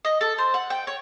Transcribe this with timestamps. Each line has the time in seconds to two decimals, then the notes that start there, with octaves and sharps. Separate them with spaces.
0.05 D#5
0.21 A4
0.38 C5
0.54 F#5
0.70 G5
0.87 C#5